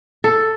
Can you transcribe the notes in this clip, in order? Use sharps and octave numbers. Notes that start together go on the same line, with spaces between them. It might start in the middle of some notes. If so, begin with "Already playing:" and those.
A4